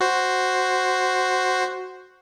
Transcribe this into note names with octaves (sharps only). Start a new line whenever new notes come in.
F#4 C5